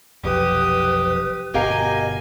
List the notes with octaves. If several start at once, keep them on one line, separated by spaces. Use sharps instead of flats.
F1 B1 F2 G4 B4 D#6
G1 B2 G4 A#4 D#5 F5 G#5